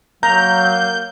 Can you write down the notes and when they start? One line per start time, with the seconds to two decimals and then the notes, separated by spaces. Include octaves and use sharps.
0.23 F#3 A#3 A#5 G6